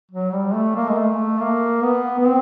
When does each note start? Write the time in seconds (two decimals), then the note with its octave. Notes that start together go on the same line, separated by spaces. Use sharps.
0.11 F#3
0.33 G3
0.54 A3
0.76 A#3
0.88 G#3
0.98 A3
1.40 A#3
1.84 B3
2.19 B3
2.26 C4